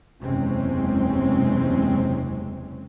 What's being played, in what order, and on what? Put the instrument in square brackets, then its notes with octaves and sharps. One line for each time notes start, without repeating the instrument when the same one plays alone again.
[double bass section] F#1 E2 C3 G#3 C4 C#4